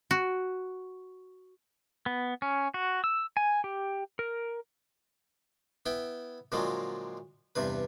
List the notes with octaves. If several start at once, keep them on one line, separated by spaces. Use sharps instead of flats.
F#4
B3
C#4
F#4
E6
G#5
G4
A#4
B3 E4 G5
A#2 D3 F3 F#3 G#3
E2 G2 C3 B4